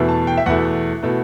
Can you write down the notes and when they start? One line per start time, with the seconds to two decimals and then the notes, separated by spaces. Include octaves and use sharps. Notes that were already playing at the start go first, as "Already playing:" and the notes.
Already playing: E2 B2 A3 E4
0.09 A5
0.27 G5
0.37 E5
0.46 E2 B2 A3 E4 F#5
1.03 B2 A3 E4